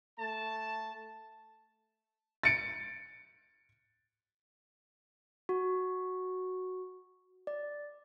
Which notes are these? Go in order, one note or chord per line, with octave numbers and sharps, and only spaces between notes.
A3 A5
A6 C#7 D7
F#4
D5